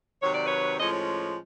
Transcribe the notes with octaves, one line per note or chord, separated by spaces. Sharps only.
C3 D#3 F#3 C#5
D5
B4 C#5
A2 F3 G#3 C#4 C#5 D#5